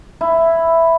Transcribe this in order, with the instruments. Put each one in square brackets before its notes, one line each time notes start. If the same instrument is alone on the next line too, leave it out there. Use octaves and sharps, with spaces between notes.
[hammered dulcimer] E4